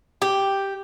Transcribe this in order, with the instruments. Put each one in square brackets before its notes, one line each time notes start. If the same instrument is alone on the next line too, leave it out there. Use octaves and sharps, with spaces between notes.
[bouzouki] G4